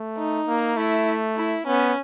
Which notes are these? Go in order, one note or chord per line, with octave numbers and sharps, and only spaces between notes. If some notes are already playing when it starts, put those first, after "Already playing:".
Already playing: A3
D#4
A#3
A3 E4
E4
B3 C#4